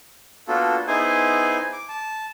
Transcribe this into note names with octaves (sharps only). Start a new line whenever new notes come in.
A#3 B3 D4 F4 F#4 A4
B3 D#4 E4 G#4 C5 G#5
D6
A5